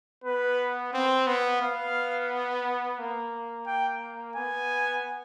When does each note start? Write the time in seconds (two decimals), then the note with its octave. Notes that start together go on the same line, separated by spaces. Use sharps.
0.24 B3 B4
0.93 C4
1.27 B3
1.61 B3 F5
2.99 A#3
3.67 G5
4.36 B3 G#5